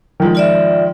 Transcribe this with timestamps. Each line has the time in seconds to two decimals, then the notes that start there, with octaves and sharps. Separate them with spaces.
0.20 D#3 F3 G#3
0.35 F4 D5 E5